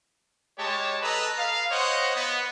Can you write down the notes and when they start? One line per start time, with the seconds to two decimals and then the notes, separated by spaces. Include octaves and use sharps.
0.59 G#3 G4 C#5 A5
1.02 A4 B4 D#5 A#5
1.39 F5
1.71 C5 C#5 D#5 F#5
2.16 B3